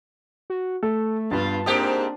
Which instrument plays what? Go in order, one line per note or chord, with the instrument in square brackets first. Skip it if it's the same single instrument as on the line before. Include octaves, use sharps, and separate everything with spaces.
[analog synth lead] F#4
[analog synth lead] A3 [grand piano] A4
[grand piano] G2 G3 B3 [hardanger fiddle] F4 F5 [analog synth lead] A5
[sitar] G#2 G4 [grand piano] A#3 C5 D#6 [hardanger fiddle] C4 D4